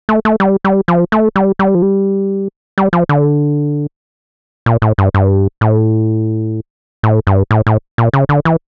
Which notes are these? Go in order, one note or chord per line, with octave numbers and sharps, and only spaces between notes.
A3
A3
G3
G3
F3
A3
G3
G3
F3
G3
G3
F3
D3
A#2
A2
G2
G2
A2
A2
G2
A2
A2
A#2
C#3
D3
E3